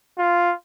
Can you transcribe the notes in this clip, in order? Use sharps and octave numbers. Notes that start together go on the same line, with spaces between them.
F4